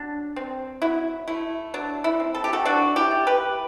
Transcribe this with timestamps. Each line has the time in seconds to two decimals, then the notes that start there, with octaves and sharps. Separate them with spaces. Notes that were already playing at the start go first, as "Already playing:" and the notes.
Already playing: F#3 D4
0.36 C4
0.82 F#3 E4
1.28 A3 E4
1.74 F#3 D4
2.04 E4
2.20 C4
2.34 A4
2.44 G4
2.53 F#4 A4
2.65 F#3 D4 F#4
2.96 E4 G4
3.11 A3
3.27 G4 B4